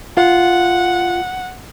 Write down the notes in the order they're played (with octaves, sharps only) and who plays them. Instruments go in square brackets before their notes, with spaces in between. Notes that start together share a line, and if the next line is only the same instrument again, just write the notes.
[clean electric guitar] F4 [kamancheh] F#5